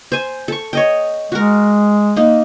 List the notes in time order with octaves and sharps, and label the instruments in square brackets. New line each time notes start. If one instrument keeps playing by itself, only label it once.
[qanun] C5 G#5
A4 C#6
C#5 D#5 G5
[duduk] G#3 [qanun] F#4 A#4
[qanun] A#3 D#4